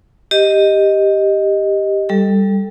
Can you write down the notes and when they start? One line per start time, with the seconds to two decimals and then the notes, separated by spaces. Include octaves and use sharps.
0.31 G4 D#5
2.09 G3 A4